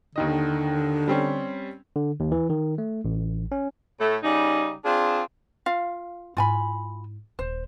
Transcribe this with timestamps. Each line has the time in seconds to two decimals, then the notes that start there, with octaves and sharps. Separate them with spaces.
0.16 D#2 D3 D#3 D#5
1.08 G3 C4 C#4
1.96 D3
2.20 D#2
2.32 E3
2.50 D#3
2.78 A3
3.05 A1
3.52 C#4
3.99 A2 A3
4.22 C#3 G3 D#4
4.84 C4 D4 F4 G#4
5.66 F4 F5
6.37 G#2 E4 F4 G#5 B5
7.39 D#1 C5